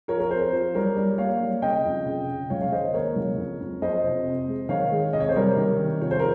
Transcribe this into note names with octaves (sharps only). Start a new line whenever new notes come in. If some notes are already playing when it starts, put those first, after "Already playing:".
F3 A#4 C#5
A#4
C4 C5
F3
G3 A#4 C#5
G3
A#3 C#5 F5
G3
C#3 D#5 G5
F2
C#3
C#3
C#2 C#5 F5
F5
D#3 C5 D#5
A#3 A#4 C#5
C#2
F2
F2
F2 C5 D#5
C3
C4
G#3
D#3 C#5 F5
G#3
C3 D#5
C#5
C5
G3 A#4 C#5
D#3
C3
F3 C#5
C5
A#4